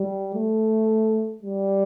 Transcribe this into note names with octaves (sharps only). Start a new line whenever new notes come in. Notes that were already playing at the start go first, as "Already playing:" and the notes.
Already playing: G3
A3
G3